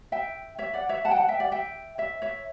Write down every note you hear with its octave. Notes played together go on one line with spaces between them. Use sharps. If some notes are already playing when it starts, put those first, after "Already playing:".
E5 G5
C#5 E5
D5 F#5
C#5 E5
F#5 A5
G5
F#5 A5
E5 G5
D5 F#5
E5 G5
C#5 E5
C#5 E5